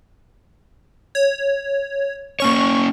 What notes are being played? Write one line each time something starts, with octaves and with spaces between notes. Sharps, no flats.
C#5
A#3 C#4 C#5 C#6